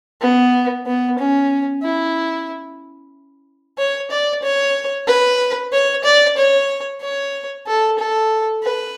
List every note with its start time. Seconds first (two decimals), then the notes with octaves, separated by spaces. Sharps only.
0.21 B3
0.86 B3
1.19 C#4
1.83 E4
3.78 C#5
4.11 D5
4.43 C#5
5.07 B4
5.72 C#5
6.05 D5
6.37 C#5
7.01 C#5
7.67 A4
7.99 A4
8.63 B4